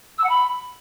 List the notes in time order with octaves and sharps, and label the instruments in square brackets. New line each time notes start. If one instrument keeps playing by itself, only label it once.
[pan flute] E6
F#5
B5